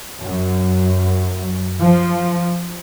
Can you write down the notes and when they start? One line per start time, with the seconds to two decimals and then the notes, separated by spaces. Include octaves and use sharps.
0.23 F#2
1.81 F3